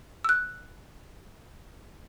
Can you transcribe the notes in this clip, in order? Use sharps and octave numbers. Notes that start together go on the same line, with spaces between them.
E6 F#6